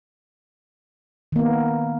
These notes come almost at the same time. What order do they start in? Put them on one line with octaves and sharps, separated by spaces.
D#3 A#3 B3